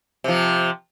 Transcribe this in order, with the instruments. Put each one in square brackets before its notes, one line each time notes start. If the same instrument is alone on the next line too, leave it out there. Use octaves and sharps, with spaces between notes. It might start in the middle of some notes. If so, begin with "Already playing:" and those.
[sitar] C3 F3